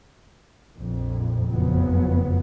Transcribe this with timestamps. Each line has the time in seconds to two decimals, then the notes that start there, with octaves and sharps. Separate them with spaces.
0.77 A#1 F2
1.48 F#1 F2 F3 F#3 B3